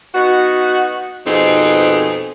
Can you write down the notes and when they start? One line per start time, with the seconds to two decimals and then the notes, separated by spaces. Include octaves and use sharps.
0.15 B3 D#4 F#4
1.26 F2 B2 C4 D#4 G#4